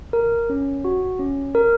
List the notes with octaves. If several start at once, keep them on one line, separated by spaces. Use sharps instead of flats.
A#4
C#4
F#4
C#4
A#4